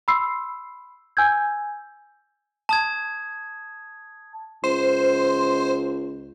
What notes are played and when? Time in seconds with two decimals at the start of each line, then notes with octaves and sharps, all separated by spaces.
0.08 B5 C6 E6 C7
1.17 G#5 E6 G6 G#6
2.69 A5 D#6 G#6
4.64 C#2 C5